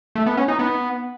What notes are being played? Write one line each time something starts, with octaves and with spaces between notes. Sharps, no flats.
A3
B3
C#4
D#4
B3